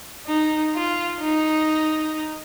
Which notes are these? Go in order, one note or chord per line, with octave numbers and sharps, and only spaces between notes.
D#4
F4
D#4